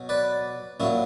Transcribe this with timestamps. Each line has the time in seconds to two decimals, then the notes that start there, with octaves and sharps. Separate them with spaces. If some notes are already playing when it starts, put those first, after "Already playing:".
Already playing: B2 F#3
0.09 B4 D5
0.80 A#2 F#3 C#4 E4